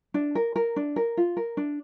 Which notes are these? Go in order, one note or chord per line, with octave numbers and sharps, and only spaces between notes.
D4
A#4
A#4
D4
A#4
F4
A#4
D4